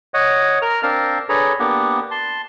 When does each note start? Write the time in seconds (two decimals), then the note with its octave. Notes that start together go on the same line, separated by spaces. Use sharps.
0.14 C#5 D#5 F#5
0.62 A#4 F6
0.83 C4 D4 A#4 F5 A5
1.29 D4 G#4 A4 B4 C#5 A#5
1.59 A#3 B3 D4 G4 F#5
2.11 A5 C6